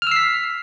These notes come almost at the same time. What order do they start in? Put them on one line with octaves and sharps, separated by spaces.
F6 E6 C7 B6